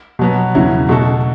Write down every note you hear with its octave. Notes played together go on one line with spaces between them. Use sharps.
B2 F#3 B3
E2 C#3 F#3 C#4 E4
B2 A3 F#4 A4